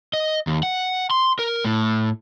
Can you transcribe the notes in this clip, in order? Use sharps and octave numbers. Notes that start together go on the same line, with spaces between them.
D#5
D#2
F#5
C6
A#4
A2